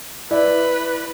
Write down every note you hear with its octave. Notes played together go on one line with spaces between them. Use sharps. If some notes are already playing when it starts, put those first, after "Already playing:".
E4 B4 D5